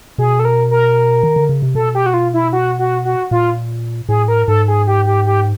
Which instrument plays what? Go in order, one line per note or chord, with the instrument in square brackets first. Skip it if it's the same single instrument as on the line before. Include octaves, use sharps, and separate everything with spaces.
[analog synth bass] B2 [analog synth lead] G#4
[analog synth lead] A4
A#4
A#4
[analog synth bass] D#3
D3
C#3
C3
[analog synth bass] B2 [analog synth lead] A4
[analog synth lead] G4
F#4
F4
E4
F#4
F#4
F#4
[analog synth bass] A#2 [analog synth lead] F4
[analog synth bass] A2 [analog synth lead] G#4
[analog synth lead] A#4
[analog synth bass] G#2 [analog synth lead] A4
[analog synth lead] G#4
G4
G4
G4